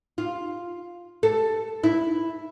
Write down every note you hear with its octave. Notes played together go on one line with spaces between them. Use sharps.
F4
A4
E4